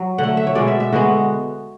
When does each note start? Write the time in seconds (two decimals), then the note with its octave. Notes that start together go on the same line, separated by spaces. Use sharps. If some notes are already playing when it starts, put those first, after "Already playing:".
Already playing: F#3
0.18 D3 A3 F#5
0.37 E5
0.47 C#5
0.55 B2 G#3 B3 D5
0.67 E5
0.80 E5
0.93 D3 G#3 B3 F#4